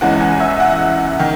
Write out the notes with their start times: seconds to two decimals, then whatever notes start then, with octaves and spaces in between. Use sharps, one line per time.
0.01 E2 C#3 E3 G#3 F#5
0.20 G#5
0.40 E5
0.60 F#5
1.19 D#3